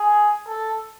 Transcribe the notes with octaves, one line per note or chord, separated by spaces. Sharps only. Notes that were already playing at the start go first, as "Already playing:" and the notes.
Already playing: G#4
A4